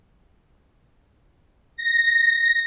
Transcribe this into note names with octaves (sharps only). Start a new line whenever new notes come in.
A#6